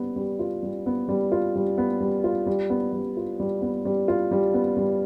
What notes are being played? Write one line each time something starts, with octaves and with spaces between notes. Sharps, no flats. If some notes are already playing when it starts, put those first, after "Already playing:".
Already playing: G3 B3
G3
F4
G3
B3
G3
F4
G3
B3
G3
F4
G3
B3
G3
F4
G3
B3
G3
F4
G3
B3
G3